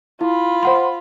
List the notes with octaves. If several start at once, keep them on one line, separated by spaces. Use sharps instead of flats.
E4 F4 B5
C5 F#5 C6